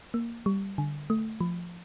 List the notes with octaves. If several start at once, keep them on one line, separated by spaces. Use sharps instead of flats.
A#3
G3
D3
A3
F3